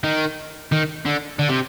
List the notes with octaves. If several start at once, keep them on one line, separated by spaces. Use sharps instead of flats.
D#3
D#3
D3
D3
C3